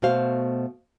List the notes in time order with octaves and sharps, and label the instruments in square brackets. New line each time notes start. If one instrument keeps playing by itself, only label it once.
[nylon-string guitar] B2 A3 F#4 C5 F5